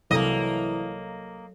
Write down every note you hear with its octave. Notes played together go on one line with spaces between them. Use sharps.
C2 E3 F#3 A#3 A4 D#5